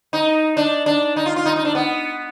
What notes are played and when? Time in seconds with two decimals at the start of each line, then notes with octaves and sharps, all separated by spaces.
0.13 D#4
0.57 D4
0.86 D4
1.16 D#4
1.26 F4
1.36 F4
1.45 D#4
1.56 D#4
1.65 D4
1.75 B3